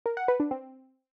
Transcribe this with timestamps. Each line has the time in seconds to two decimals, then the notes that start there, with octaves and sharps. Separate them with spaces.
0.06 A#4
0.17 F#5
0.28 B4
0.40 D4
0.51 C4